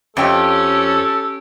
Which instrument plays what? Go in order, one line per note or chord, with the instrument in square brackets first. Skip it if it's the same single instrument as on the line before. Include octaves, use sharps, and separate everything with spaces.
[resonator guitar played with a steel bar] F2 G5 [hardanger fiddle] C#4 G4 [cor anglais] A4